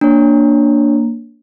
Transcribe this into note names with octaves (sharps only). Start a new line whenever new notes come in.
A#3 D4 C#5